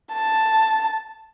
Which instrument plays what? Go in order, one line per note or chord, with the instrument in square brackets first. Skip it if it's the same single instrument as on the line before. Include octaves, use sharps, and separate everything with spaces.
[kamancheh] A5